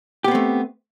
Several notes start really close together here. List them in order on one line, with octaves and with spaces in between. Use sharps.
G4 B3 C4 A3